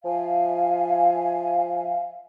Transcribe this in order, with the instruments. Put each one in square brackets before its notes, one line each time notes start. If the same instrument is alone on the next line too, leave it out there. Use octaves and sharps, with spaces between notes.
[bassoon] F3 [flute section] E5 F5 G#5